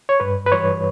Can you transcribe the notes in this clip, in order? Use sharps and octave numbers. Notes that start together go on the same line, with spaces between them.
C#5
G2 B4
B4
E3 G3 C#5